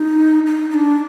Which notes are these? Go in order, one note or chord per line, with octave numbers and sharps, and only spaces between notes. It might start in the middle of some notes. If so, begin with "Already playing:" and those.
Already playing: D#4
D#4
D#4
D4